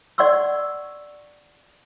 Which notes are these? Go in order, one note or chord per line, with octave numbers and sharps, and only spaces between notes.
D5 F#5 C6 C#6 E6